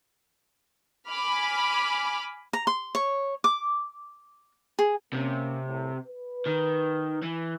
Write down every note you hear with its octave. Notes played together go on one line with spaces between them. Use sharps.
G#5 B5 D6 F6
A#5
C6
C#5
D6
G#4
C3 A#3 C#4
C2 A2
B4
D#3
E3